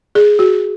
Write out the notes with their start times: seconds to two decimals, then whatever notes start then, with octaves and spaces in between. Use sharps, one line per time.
0.15 G#4
0.39 F#4